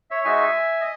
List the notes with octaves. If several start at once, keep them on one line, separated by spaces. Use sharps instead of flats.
C#5 E5
G#3 D#4 F#4 E5 G#5
D#5